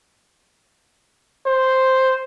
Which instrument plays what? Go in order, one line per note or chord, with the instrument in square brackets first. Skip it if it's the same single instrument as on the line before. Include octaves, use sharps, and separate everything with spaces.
[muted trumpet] C5